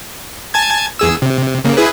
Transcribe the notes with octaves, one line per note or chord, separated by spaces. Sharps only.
G#5 A5 G#6
E2 G#4 E6
C3
C3
C#3 A#3
E4 G#4 B4